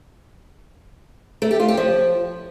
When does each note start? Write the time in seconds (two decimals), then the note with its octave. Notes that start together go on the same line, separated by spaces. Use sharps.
1.42 A3
1.51 G4
1.60 F4
1.68 G4
1.77 F3